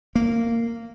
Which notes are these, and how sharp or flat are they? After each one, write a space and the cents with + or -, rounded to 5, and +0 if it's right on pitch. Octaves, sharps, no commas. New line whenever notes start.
A#3 -15